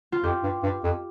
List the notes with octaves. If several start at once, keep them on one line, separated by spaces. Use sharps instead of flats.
F4
F2 G4
G2
G2
F2